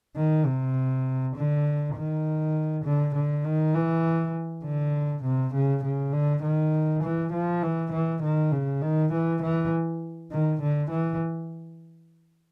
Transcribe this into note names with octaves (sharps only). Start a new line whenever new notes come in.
D#3
C3
D3
D#3
D3
D3
D#3
E3
D3
C3
C#3
C#3
D3
D#3
E3
F3
E3
E3
D#3
C#3
D#3
E3
E3
D#3
D3
E3